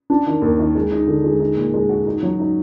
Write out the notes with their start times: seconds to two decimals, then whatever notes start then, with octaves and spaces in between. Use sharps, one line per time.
0.10 D4
0.26 D#3
0.42 D#2
0.59 D#3
0.75 G#3
0.92 D#4
1.07 D3
1.24 G#3
1.40 D#4
1.56 A#2
1.74 G#3
1.89 F#4
2.06 D#4
2.23 F#3
2.39 D#4